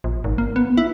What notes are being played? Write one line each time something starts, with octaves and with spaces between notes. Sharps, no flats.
A#1
G#1
A#3
B3
E4